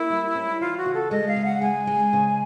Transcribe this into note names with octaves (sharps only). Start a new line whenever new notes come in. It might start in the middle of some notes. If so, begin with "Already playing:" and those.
Already playing: A#3 E4
G3
C#4
E3 F4
F#4
C#3
A4
G#3 D#5
F5
C#3
F#5
G#3 G#5
G#3
C#3